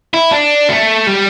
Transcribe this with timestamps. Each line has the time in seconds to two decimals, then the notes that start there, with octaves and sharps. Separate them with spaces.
0.14 E4
0.31 D4
0.69 A3
1.07 G3